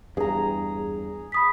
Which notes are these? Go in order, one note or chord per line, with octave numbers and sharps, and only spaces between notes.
E2 G2 G#4 A#5
B5 D#6 B6